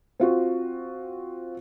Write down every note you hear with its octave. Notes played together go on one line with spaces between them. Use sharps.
C4 F4 F#4